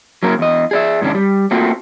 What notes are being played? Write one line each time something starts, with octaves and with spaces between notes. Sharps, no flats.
F#3 A#3 C#4 A#4
E2 D#5
G#4 D5 E5
G#2 C3 D#3 C#4 D4
G3
A3 A#3 C4 F4 F#4